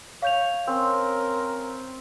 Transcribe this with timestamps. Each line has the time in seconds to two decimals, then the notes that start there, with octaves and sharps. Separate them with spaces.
0.22 C#5 F5 G6 F7
0.67 C4 C#4 A#4